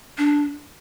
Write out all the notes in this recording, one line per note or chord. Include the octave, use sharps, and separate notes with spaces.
D4